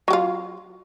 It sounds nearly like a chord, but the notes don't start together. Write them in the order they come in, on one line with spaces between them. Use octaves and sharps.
F#3 G4 F4